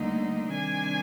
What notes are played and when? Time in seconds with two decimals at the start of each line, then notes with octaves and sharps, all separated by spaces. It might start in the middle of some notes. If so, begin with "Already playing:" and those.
Already playing: D2 D3 G3 A#3 D#4
0.53 C3 D#3 G3 D4 G#5